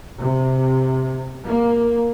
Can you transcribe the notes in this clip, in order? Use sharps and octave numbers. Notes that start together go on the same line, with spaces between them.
C3
A#3